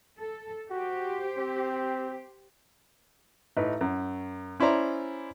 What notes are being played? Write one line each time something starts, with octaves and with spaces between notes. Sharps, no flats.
A4
F#4 G4 C5
C4
A1 D#4 B4
F#2
C#4 E4 C5 D5 A#5 C6